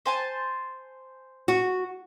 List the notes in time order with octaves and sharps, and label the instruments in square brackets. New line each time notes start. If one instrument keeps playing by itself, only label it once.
[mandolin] C5 G#5 A5
[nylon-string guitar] F#4